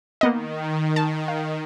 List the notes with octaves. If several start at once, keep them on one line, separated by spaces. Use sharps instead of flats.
D#3 A#3 B3 D#5
A5
F5